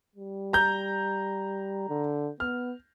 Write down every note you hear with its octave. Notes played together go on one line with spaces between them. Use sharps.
G3
A#5 G6
D3
B3 F6